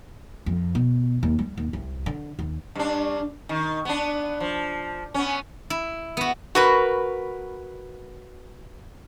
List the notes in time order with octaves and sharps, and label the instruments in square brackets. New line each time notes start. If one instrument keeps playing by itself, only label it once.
[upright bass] F2
B2
D#2
G3
D#2
C2
D3
D#2
[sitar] G2 D4
D#3
B3 D4
F3
B3 C#4
[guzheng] E4
B3 F#4
[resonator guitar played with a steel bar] F#4 A#4 B4